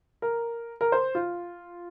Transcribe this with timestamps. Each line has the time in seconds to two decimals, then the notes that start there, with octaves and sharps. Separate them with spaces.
0.22 A#4
0.81 A#4
0.92 C5
1.15 F4